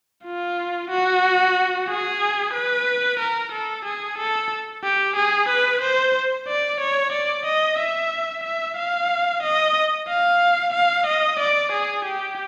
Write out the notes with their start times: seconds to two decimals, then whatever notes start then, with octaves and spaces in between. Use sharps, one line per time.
0.24 F4
0.90 F#4
1.88 G#4
2.54 B4
3.19 A#4
3.53 A4
3.86 G#4
4.18 A4
4.84 G4
5.17 G#4
5.49 B4
5.81 C5
6.48 D5
6.81 C#5
7.13 D5
7.46 D#5
7.79 E5
8.44 E5
8.77 F5
9.43 D#5
10.08 F5
10.74 F5
11.07 D#5
11.40 D5
11.72 G#4
12.05 G4